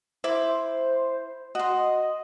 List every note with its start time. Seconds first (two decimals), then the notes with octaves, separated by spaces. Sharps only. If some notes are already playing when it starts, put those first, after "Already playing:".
0.24 E4 C5 D6
1.55 F#4 D#5 C6